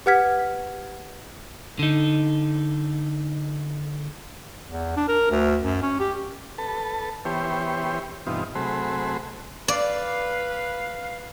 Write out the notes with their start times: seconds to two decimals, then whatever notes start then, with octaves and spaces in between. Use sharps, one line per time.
0.06 G4 B4 F#5 F6 G#6 B6
1.79 D3 D#4
4.68 E2
4.97 D4
5.08 A#4
5.31 D2
5.62 F#2
5.83 C#4
6.00 G4
6.58 A4 B4 A5
7.25 E3 B3 G4 C5 C#5
8.27 G2 B2 E3 C4 D#4 F4
8.55 C3 F#3 A3 G#4 C5 B5
9.68 B4 D5 F5